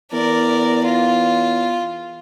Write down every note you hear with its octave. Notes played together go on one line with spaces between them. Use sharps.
E2 A#4 D5
F4